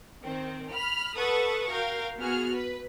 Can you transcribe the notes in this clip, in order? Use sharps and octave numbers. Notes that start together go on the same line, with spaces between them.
D#3 C4
B5 F6
A4 B4 F#5 A5 C#6 D#6
F#4 A#4 F5 G5
B3 F#4 G#4 F6
B4